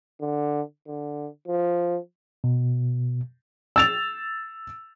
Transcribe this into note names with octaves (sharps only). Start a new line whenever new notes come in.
D3
D3
F3
B2
E6 A6 F7